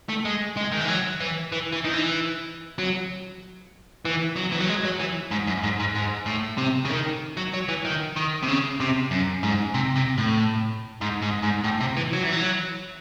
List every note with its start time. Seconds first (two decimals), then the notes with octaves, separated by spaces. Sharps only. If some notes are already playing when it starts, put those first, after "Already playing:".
0.09 A3
0.25 G#3
0.57 G#3
0.72 D#3
0.80 E3
0.88 F#3
1.20 E3
1.52 E3
1.72 E3
1.84 D#3
1.94 E3
2.79 F#3
4.05 E3
4.36 F#3
4.52 E3
4.60 F#3
4.68 G#3
4.84 F#3
4.99 E3
5.31 G#2
5.47 F#2
5.63 G#2
5.80 G#2
5.95 G#2
6.26 A2
6.58 C3
6.85 C#3
6.90 D#3
7.37 F#3
7.53 F#3
7.68 E3
7.85 D#3
8.16 D#3
8.43 C3
8.48 C#3
8.80 C3
9.11 F#2
9.43 G#2
9.74 C3
9.96 C3
10.18 A2
11.01 G#2
11.22 G#2
11.43 G#2
11.64 A2
11.80 C3
11.97 E3
12.13 F#3
12.23 E3
12.32 F#3